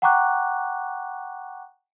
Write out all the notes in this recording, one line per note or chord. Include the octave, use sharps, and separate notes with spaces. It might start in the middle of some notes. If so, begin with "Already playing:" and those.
F#5 G5 A#5 C#6 D6 F#6